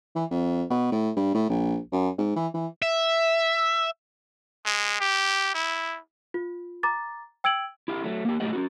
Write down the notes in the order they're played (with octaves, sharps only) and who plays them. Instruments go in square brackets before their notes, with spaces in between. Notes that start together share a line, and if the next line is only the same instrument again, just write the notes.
[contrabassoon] E3
F2
B2
A2
G2
A2
A#1
F#2
G#2
E3
E3
[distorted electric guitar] E5
[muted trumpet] G#3
G4
E4
[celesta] F4
A#5 D6 A6
G5 E6 G#6 D7 F#7
[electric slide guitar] E4 G4 F5
F#3 A3
A#3 G4
A2 F#3 A3 G4 D#5 F#5
C#4 D#4 F#4